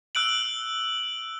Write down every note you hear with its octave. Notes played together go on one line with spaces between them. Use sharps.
E6 F#6 D7 F#7